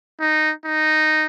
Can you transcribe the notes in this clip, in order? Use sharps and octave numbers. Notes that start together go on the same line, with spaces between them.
D#4
D#4